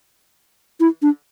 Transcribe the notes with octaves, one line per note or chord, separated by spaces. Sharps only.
E4
D4